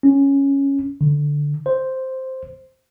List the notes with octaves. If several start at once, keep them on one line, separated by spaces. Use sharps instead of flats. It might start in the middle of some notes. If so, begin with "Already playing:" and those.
C#4
D3
C5